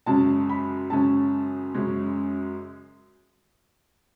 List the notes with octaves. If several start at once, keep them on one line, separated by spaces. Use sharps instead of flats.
F#2 C#3 G#3 C#4 A5
B5
F#2 C#3 G#3 C#4 A5
F#2 C#3 G#3 C#4